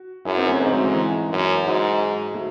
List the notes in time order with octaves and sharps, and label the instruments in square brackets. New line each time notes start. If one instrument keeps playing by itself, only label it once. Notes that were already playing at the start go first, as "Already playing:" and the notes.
Already playing: [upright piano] F#4
[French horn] F#2 [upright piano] E4 G#4
[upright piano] C4 D#4
A3 C#4
[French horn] G#2 [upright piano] G#3 C4
[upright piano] F#3 A3
E3 G#3
E3
[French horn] F#2
[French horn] G#2 [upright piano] F#3
[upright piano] F#3 A3